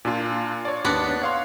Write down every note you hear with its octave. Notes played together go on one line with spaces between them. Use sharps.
A#2 D4 F4
C#5 D5
D#2 B3 D4
C#5 F5 C6